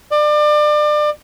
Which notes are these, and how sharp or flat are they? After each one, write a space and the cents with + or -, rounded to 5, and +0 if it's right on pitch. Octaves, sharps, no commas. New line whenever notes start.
D5 +30